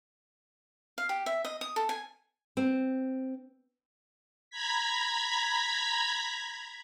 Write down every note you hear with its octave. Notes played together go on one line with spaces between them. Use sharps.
F5
G4
E5
D#5
D#6
A4
G#5
C4
A#5 B5 G#6 B6